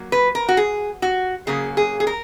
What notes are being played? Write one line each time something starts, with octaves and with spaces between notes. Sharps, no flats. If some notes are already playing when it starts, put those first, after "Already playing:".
Already playing: F#3 A#3
B4
A#4
F#4
G#4
F#4
C#3 F#3 A#3 G#4
G#4
G#4
A#4